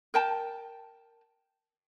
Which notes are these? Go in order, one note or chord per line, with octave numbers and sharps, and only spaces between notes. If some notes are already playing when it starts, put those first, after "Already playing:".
A#4 G5 A5